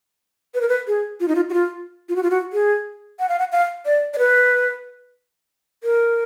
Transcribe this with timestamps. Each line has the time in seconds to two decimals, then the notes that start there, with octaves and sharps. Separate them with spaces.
0.54 B4
0.61 A#4
0.69 B4
0.87 G#4
1.20 F4
1.28 D#4
1.35 F4
1.50 F#4
1.54 F4
2.09 F4
2.16 F#4
2.23 F4
2.31 F#4
2.53 G#4
3.19 F#5
3.29 F5
3.39 F#5
3.52 F5
3.86 D5
4.14 D5
4.19 B4
5.84 A#4